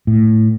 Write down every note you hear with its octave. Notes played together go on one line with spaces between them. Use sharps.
A2